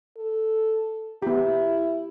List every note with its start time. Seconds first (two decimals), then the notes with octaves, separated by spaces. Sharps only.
0.16 A4
1.22 B3 E4 G4